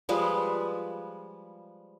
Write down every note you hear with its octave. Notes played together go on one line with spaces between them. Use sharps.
F3 G3 G#3 B4